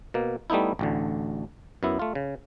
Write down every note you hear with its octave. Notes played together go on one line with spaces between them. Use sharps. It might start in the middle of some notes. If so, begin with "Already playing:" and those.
B2 A#3
G3 A3 B3 D#4 E4
A1 D2 D3
F#2 B3 E4
A3 F4
C#3